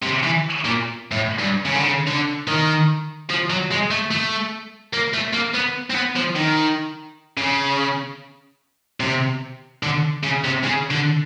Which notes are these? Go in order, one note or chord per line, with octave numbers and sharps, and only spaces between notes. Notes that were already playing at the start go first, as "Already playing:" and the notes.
C3
E3
A#2
A2
G2
C#3
D3
C#3
D3
D#3
F3
F#3
G#3
A3
A3
A#3
A3
A#3
B3
C4
B3
F3
D#3
C#3
C3
D3
C#3
C3
C#3
D3